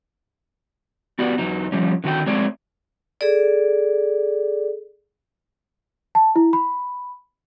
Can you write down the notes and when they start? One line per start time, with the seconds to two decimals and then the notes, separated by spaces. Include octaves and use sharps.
1.19 B3 F#4 G4 D5
1.38 E2 F#3 D#4
1.72 F3 G3 C#4
2.04 D3 D#3 F#4 C#5 G5
2.26 F#3 G#3 A3 C4 C#5 D5
3.21 G#4 A4 D5
6.15 A5
6.36 E4
6.53 B5